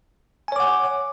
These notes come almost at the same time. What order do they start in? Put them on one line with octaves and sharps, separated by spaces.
G#5 C#5 D6 F#5